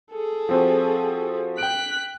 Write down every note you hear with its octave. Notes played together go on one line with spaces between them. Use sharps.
G#4 A4
F3 C4 F#4
G5 F#6 B6 D7